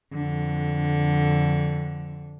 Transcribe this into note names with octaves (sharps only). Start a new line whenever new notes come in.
F2 D3